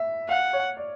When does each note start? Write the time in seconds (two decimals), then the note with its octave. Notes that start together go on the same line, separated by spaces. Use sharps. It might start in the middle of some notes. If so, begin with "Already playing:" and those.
Already playing: E5
0.29 F5 F#5
0.53 C#5
0.77 D5